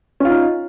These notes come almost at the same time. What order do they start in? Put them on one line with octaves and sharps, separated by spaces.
C#4 F4 D#4